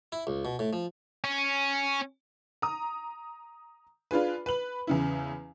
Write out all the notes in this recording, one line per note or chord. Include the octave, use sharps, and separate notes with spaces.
E4
C#2
B2
A2
F3
C#4
A#5 D#6
D4 F4 G#4 B4
B4 F#7
E2 C#3 E4